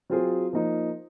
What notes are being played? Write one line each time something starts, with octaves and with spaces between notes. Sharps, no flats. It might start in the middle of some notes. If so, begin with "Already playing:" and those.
F#3 C4 F4 G#4
F3 A#3 D#4